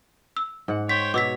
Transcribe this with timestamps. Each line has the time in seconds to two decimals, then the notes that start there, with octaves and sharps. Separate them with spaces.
0.37 E6
0.68 G#2 F#5
0.89 C5 C#5 G5 B6
1.14 B2 C#5 D6 E6 B6